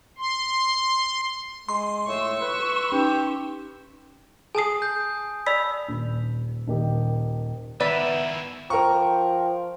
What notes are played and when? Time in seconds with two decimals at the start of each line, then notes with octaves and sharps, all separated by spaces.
0.18 C6
1.69 G#3 C6
2.07 A2 C#6 E6
2.41 B4
2.92 C#4 D#4 G4 B4
4.55 G#4 G#5 A5 D#6 C7
4.82 G6
5.46 D5 B5 E6 B6 F7
5.88 D#1
6.67 D#1 D#3 G4
7.80 D#3 B3 E4 B4 D5 E5 A6 B6
8.70 F3 A#4 G5 C#6